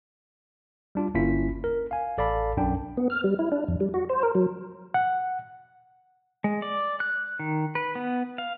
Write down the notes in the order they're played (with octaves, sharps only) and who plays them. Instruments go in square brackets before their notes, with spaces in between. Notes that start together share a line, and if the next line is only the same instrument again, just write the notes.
[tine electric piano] G3 D4 F4
G1 A#3 C#4 E4 F4 B6
A#4
F5 G#5
A1 A4 D5 F5 A5 B5
B1 F#2 D4 G5
[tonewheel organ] B3
F6
G3
E4
D4
F2
G3
F#4
C5
A#4
F#3
[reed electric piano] F#5
[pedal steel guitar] G#3
D5
F#6
D#3
B4
B3
F5